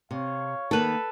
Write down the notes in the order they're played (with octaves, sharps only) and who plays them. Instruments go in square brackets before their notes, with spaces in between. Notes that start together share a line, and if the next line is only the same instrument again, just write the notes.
[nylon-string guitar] C3 [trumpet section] C#5 F5
[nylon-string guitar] D#3 A#3 [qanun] A4 B4